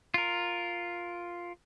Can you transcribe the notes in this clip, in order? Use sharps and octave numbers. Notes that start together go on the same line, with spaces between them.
F4 A#4